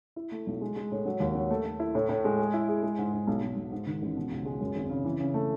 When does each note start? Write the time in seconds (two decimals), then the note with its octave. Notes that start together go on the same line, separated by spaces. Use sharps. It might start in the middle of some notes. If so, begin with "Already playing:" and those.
0.16 E4
0.32 A3
0.47 B1
0.61 G#3
0.76 G#3
0.92 A2
1.05 F#3
1.20 D#2
1.35 F#3
1.50 A3
1.65 A3
1.80 E4
1.95 A2
2.09 A2
2.24 G#3
2.38 G#4
2.54 E4
2.68 G#4
2.83 G#3
2.98 G#2
3.13 G#2
3.27 B1
3.42 B1
3.57 B1
3.72 G#2
3.87 D#3
4.02 A1
4.17 B2
4.31 C#2
4.45 G#3
4.61 F#2
4.76 G#1
4.90 C#3
5.05 E3
5.20 C#3
5.34 A3